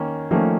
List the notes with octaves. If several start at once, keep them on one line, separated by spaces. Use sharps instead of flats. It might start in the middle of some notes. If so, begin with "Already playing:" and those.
Already playing: D#3 A#3 C#4
D#3 F3 A3 A#3 C#4